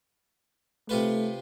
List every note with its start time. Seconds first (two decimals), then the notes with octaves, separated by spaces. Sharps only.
0.89 C3 A3 F4 B4